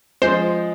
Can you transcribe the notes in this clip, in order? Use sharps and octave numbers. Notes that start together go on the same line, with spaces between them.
F3 G#3 C5